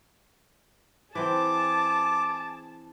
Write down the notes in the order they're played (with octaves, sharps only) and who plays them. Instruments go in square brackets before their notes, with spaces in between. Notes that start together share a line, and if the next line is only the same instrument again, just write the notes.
[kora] E3 C4 [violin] G#4 A5 [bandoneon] D6